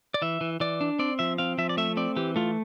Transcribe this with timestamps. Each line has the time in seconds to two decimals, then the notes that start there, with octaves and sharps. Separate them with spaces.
0.14 D5
0.22 E3 E5
0.41 E3
0.60 E3 D5
0.81 D4
0.99 C4 D5
1.19 F3 E5
1.38 C4 F5
1.58 F3 E5
1.69 D5
1.77 A3 E5
1.97 C4 D5
2.16 E3 G4
2.36 A3 F4